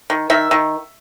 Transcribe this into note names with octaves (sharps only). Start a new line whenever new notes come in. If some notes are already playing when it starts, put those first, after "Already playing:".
D#3
D#3 E5
D#3